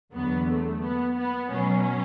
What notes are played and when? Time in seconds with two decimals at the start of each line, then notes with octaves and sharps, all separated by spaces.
0.12 E2 D3 F#3 B3
0.47 A3
0.81 B3
1.17 B3
1.51 B2 F#3 C#4